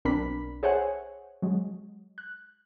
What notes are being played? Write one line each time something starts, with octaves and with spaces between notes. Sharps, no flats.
B1 C4 D4 A#4 B5 B6
G#4 C5 C#5 E5 F#5 G#5
F#3 G#3
F#6